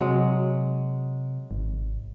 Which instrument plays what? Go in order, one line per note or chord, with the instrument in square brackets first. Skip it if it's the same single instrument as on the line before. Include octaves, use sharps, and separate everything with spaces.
[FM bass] C3 [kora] F#3 G#3
[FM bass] G#1